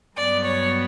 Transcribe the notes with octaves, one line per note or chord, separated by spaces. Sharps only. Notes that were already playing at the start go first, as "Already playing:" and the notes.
G2 F#3 B3 D5
C#5